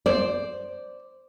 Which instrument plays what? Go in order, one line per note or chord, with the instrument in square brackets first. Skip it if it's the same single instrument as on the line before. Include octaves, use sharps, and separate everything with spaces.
[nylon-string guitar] C5 D5